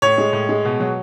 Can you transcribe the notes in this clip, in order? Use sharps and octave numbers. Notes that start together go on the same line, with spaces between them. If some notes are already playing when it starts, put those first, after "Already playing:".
A2 C#5
G#3
A2
G#3
B2
F#3